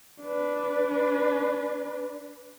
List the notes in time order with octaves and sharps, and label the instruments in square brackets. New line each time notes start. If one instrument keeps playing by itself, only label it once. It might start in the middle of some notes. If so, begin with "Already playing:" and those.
[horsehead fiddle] D4 B4